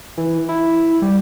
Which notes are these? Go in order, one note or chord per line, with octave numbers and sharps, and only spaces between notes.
E3
E4
G3